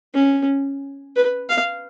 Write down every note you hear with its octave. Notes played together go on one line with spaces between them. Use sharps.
C#4
B4
F5